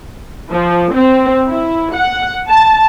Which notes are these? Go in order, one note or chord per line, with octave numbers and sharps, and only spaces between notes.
F3
C4
E4
F#5
A5